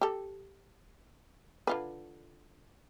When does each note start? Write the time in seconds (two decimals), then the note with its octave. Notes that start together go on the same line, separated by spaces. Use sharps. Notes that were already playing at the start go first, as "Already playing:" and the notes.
0.01 G4 A4
1.67 D3 F4 B4